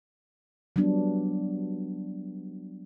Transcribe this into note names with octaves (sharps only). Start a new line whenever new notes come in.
F#3 G3 B3 D4